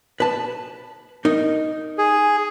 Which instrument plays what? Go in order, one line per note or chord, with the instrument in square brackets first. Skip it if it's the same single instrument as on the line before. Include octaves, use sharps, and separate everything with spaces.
[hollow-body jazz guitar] B4 A5
D#4 A#4
[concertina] G#4